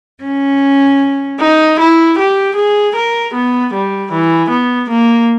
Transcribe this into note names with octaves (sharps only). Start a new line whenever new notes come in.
C#4
D#4
E4
G4
G#4
A#4
B3
G3
E3
B3
A#3